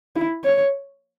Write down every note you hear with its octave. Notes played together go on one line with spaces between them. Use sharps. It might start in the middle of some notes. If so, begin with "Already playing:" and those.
E4
C#5